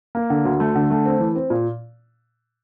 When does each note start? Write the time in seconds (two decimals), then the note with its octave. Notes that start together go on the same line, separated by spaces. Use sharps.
0.15 A#3
0.30 D3
0.45 D2
0.60 A3
0.75 D3
0.90 A3
1.05 C4
1.20 E3
1.35 C4
1.50 A#2